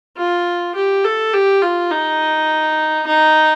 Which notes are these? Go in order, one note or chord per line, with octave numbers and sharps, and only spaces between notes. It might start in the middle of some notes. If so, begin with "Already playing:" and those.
F4
G4
A4
G4
F4
D#4
D#4